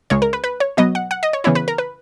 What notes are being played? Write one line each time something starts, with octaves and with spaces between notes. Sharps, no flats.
C#2 C#3 G#3 C#5
A#4
B4
B4
C#5
B2 F#3 B3 D#5
F#5
F#5
D#5
C#5
C#3 E3 B3 E4 C#5
B4
A#4
B4